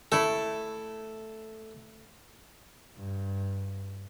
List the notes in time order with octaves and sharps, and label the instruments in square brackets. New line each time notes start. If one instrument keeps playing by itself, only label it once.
[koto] A3 E4 [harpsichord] A4
[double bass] G2